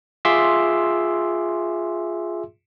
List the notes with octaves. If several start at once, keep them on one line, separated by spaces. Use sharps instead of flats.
F4 G#4 E5 C6 D6 E6